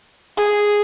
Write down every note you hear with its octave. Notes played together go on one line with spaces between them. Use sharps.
G#4